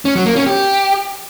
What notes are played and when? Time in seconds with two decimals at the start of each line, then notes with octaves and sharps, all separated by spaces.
0.05 C#4
0.15 F#3
0.26 A#3
0.36 C#4
0.46 G4